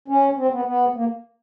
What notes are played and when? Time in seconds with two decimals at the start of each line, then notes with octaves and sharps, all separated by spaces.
0.08 C#4
0.37 C4
0.51 B3
0.65 B3
0.94 A#3